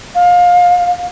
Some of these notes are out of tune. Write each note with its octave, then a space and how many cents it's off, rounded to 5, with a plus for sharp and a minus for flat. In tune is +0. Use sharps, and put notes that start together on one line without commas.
F5 +25